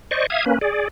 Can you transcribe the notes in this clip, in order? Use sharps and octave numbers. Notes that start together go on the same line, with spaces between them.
C5 D5 D#5 C#6
E5 F5 D#6 G#6
A#3 C#4 B4
G#4 D5